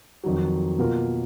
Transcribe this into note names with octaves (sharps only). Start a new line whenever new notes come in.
F2 D#3 F#3
B2 A#3 F4 A#4